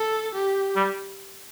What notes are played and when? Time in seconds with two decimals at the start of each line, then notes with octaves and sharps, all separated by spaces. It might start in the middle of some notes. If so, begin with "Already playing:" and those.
Already playing: A4
0.35 G4
0.76 G3